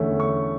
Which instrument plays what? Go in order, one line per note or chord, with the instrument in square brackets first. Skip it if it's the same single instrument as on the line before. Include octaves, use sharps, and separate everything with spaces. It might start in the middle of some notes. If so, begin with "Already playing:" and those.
Already playing: [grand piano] E2 D3 A3 C#4
C#6